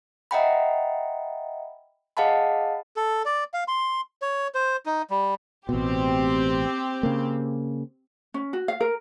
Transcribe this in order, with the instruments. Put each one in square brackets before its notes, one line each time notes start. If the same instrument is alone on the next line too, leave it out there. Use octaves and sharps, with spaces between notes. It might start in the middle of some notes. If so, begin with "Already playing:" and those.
[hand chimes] D#5 E5 F#5 G5 A#5 B5
G#4 D#5 F5 F#5 A5 B5
[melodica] A4
D5
F5
C6
C#5
C5
D#4
G3
[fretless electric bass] A1 B2 [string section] C4 G4
[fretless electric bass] C#3 A#3
[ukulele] C#4
F#4
F5
A#4